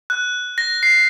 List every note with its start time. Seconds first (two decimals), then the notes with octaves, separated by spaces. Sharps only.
0.10 F#6
0.58 A#6
0.83 C7